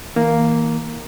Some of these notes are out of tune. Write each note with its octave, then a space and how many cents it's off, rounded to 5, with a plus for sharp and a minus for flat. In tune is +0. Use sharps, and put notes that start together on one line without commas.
E3 -40 A#3 +0